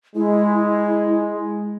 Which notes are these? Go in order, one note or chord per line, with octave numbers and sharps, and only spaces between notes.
G#3 E4